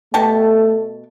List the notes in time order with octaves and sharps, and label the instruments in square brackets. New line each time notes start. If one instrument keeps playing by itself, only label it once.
[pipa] B2 G4 A5 [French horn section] A3